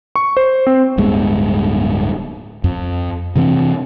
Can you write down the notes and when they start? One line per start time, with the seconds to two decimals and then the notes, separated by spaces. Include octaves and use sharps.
0.16 C#6
0.37 C5
0.67 C4
0.98 D1 G2 G#3 B3
2.64 F2
3.36 C3 E3 F3 C4